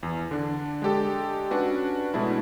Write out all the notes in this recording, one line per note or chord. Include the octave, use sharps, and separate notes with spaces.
E2
D3 D4
G#3 D4 G4 A4
C#4 D4 F#4 B4
B2 G#3 A3 D4 E4